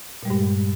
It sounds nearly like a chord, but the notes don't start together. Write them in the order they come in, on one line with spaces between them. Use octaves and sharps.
A#2 G3 G#3 G2